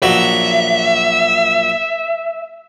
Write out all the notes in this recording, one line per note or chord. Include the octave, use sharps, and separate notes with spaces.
A#1 F#3 E5